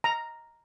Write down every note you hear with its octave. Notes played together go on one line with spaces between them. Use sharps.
A#5